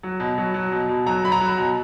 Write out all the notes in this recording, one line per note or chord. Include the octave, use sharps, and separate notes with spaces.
F#3
B2
F#3
F#3
B2
B2
F#3 A#5
F#3 B5
A#5
F#3
B2